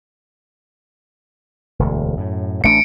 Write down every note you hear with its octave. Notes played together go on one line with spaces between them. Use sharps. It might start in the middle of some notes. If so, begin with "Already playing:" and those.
E1 D2
F#2 A2
A1 A3 D4 C#7 D7